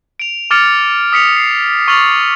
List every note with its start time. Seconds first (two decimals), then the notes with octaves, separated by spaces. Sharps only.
0.20 D7 F7
0.51 D6 F6 A6 C#7 D7 F7
1.12 D#6 B6 C#7 F7
1.36 C7
1.88 C#6 F6 A6 F7 F#7